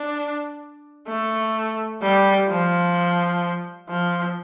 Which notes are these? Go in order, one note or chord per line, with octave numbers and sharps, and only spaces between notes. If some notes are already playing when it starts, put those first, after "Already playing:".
Already playing: D4
A3
G3
F3
F3